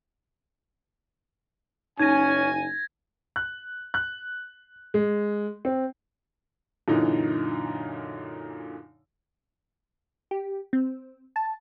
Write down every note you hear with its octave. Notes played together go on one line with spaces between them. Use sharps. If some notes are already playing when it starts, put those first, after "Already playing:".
F#1 C#4 D#4 G#5 G#6 A#6 D#7
F#6
F#6
G#3
C4
F#2 A#2 D3 E3 D#4
G4
C4
A5